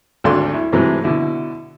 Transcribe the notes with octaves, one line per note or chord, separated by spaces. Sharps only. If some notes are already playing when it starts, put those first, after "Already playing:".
G#1 D2 D4 A4 F5 C6
E4
G#2 C3 E3 F#3 G#3 A3
B2 D3 E4